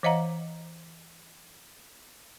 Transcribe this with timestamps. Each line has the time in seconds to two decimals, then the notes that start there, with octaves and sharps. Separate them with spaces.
0.03 E3 C5 D#5 F5 F#5 A#5